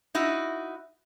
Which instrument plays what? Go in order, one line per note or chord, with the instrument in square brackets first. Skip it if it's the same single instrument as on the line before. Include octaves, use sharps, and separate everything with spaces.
[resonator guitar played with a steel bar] D#4 E4 F#4